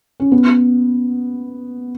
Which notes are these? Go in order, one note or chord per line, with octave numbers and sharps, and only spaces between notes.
C#4
B3